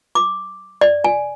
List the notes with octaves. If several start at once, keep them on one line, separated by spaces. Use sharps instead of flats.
D6
D5
G#5